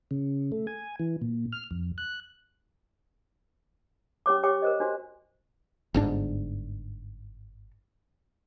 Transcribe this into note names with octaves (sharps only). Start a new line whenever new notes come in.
C#3
A3
G#5
E3
A#2
F6
F2
F#6
C#4 G4 C#5 D6
G4 C#5 G5 C#6 D6
A#4 C5 D#5
D4 F#4 C5
G1 G#2 D4